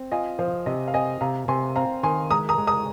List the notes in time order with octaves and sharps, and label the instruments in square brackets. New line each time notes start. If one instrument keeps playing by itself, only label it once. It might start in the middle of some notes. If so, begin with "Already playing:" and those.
Already playing: [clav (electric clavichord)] C4
[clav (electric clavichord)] F4 [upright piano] D#5 G#5
[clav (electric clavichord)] F3 [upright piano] C5 F5
[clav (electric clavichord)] C3 [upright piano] D#5
[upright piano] F5
[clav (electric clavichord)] C4 [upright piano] D#5 G#5
[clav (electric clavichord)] C3 [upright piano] F5 A#5
[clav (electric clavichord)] C3 [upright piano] G#5 C6
[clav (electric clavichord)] C4 [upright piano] F5 A#5
[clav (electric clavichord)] D#3 [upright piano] G#5 C6
[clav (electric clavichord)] G#3 [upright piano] A#5 D#6
[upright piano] A#5 D#6
[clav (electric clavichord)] G#3
[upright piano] A#5 D#6